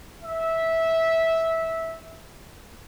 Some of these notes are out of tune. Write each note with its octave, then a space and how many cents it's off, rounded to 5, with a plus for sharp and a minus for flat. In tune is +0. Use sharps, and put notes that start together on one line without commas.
E5 -15